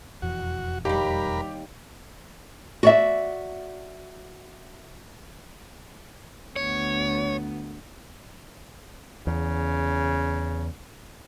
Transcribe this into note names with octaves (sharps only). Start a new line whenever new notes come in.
E1 F2 E3 F#4
D#2 G3 G4 A#4 B5
F#4 D5 E5
D2 B3 C#5
E2 C#3